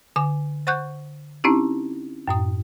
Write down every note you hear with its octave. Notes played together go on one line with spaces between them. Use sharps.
D3 G#5 D6
C5 F#5 C#6 F#6 G6
C4 C#4 D#4 E4 G4
F#2 A2 D#6